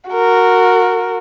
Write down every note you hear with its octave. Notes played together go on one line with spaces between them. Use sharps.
F#4 A#4